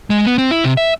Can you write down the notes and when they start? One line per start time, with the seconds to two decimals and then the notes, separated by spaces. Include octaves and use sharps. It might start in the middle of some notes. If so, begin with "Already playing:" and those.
0.10 G#3
0.26 B3
0.38 C4
0.51 E4
0.64 C3
0.77 E5